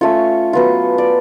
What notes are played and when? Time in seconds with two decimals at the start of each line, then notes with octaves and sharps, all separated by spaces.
0.01 A3 C#4 F4 C#5
0.53 F#3 B3 F4
0.98 D5